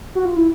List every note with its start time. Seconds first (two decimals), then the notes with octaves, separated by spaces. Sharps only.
0.15 F#4
0.25 F4
0.36 E4